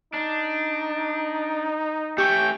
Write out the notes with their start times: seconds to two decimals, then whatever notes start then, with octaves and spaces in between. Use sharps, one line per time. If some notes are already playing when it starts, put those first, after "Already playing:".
0.14 D4 D#4
2.18 A3 C#4 G4 G5 C#6